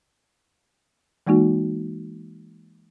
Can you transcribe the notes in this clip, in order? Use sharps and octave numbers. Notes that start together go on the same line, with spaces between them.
E3 G#3 A#3 D#4 F#4